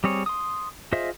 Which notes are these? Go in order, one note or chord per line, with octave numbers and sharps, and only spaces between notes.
G3 C4 G#4 C#5
C6 D#6
F4 G#4 C5 D#5 E5